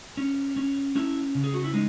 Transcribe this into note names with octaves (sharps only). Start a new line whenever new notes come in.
C#4
C#4
C#4 E4
C#3
G#4
F#4
E4
G#3 D#4